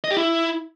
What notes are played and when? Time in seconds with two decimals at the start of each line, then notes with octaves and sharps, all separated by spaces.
0.04 D#5
0.11 G4
0.17 E4